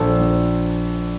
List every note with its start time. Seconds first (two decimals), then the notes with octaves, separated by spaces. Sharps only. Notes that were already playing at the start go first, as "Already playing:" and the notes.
Already playing: A#1 A4
0.19 A#1